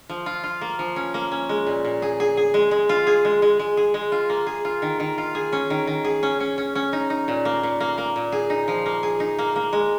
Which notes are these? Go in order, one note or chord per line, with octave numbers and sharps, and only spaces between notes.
F3
F4
F4
A#3
F3
C#4
A#3
C#4
G#3
A#2
A#2
G#4
G#4
G#4
G#3
G#3
F4
G#4
G#3
G#3
G#3
G#4
G#3
F4
A#3
G#4
F4
D#3
D#3
F4
G#4
C#4
D#3
D#3
G#4
C#4
C#4
C#4
C#4
D#4
D#4
A#2
A#3
A#2
A#3
A#3
A#2
G#4
D#4
F3
A#3
G#4
D#4
A#3
A#3
G#3